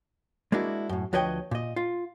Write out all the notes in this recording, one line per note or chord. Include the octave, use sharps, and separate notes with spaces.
G#3 A#3 D4 E4 F#4
F#2 A2
D2 F3 B4 C#5 D#5 G5
A#2 D#5
F4